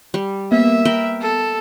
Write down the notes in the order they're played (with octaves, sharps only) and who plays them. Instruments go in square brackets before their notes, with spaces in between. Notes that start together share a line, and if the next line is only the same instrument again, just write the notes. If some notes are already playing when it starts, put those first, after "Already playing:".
[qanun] G3
[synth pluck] A#3 [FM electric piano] B3 [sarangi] E5
[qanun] A#4 G5 B5
[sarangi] A4